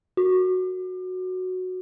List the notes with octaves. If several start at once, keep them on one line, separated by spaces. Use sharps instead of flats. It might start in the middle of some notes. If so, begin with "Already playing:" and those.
F#4